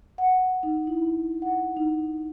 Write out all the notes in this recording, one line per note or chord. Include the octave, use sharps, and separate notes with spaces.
F#5
D#4
E4
F#5
D#4